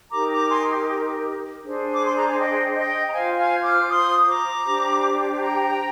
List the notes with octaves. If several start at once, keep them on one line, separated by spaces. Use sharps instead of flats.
D#4 G4 A#4 A#5 D6
A#5 D6
G#5 C6
D4 G#4 C5
D6
C6
A#5
G#5
D#5 G5
D#5 G5
A#5
F4 C5 F5 G#5
F5 G#5
D6 F6
C6 D#6
A#5 D6
D4 G4 C5
G5 A#5